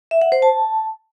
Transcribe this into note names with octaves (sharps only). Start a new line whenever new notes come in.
E5
F#5
C5
A5